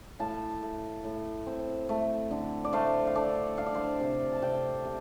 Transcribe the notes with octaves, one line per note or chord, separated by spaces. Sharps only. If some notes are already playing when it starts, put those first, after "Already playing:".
A2 F5 A5
A3
A2
C4
A3
D3
D5
A3 C5 F5
F5
D4 A4 D5
D4 F5
D5
C5 F5
C3
A5
C3 D5 G5
C3